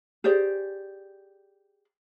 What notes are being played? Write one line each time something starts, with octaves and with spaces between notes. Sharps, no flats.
G4 G#4 C5 D5